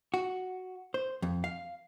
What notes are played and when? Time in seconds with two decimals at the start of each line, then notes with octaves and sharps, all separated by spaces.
0.14 F#4
0.94 C5
1.22 F2
1.44 F5